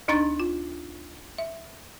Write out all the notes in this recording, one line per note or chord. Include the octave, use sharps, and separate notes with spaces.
D2 D4 D#4 A#5 C#6 A6
F4
E5